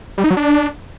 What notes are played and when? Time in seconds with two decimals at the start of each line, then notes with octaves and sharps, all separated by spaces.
0.18 G3
0.24 D#4
0.31 F#3
0.37 D4